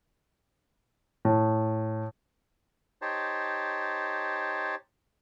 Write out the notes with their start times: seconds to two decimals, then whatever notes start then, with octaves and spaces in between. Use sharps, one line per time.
1.25 A2
3.02 D#4 G4 C5 C#5 A5